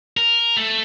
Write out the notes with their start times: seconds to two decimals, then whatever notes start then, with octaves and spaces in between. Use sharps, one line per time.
0.17 A#4
0.56 A3 A4